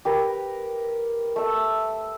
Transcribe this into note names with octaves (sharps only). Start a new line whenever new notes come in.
G4 A#4 B4
A3 E5